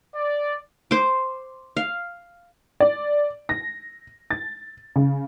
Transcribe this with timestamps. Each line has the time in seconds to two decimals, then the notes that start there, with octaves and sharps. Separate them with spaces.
0.15 D5
0.91 C5 D6
1.77 F5
2.80 D5
3.49 A#6
4.31 A6
4.96 C#3